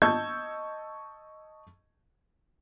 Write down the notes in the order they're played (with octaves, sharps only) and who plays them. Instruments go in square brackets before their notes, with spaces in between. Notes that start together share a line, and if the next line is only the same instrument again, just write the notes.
[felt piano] D#5 A5 C#6 E6 G6 G#6